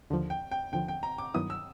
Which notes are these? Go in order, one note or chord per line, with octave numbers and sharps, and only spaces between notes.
D#2 D3 F3
G5
G5
D#2 D3 F3 G5
G5
A#5
D6
G2 D#3 F#3 B3 E4 D#6
E6